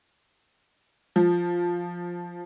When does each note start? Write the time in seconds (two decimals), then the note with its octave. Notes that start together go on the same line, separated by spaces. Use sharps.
1.16 F3